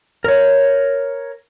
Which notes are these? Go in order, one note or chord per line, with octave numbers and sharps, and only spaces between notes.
A#4 C#5